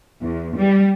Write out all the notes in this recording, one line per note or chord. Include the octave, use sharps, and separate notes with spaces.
E2
G3